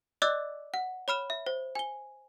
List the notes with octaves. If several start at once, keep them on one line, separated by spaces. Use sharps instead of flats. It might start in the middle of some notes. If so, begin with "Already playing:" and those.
D5 D#5 D6 E6 F#6 A6
F#5
C#5 B5 F6 E7
E5
C5
G#5 G7